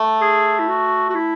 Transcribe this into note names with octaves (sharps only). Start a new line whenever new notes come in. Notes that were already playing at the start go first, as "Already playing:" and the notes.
Already playing: A3
G#4
E4
F#4
F#4
E4